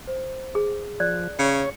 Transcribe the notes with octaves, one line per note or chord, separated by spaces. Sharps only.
C5
G#4
F3 D5 F#6
C#3 C#5 C#7